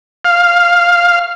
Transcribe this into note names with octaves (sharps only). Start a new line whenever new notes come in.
F5